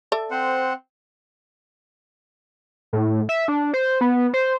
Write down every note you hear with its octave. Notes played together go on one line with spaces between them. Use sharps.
A4 D5 E5
C4 C5 F#5
A2
E5
D4
C5
B3
C5